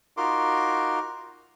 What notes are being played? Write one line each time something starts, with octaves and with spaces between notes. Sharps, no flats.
D#4 F4 F#4 A#4 C6 D6